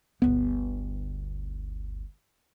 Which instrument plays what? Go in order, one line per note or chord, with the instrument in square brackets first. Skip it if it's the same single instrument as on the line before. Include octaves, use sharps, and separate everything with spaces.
[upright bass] G1 D2 [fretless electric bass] B3